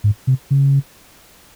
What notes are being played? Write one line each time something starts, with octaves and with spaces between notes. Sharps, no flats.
G#2
C3
C#3